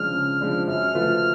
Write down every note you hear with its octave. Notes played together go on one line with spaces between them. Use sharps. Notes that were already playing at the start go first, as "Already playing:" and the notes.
Already playing: C#3 F3 G#3 D4 F6
C#3
F3 G#3 D4
F#2 F6
F3 A3 F4 B4